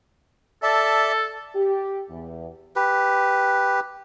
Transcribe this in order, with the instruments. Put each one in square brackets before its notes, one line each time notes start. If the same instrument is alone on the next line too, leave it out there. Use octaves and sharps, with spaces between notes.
[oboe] A4 [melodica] D5 E5 A5
[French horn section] G4
E2
[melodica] G4 B4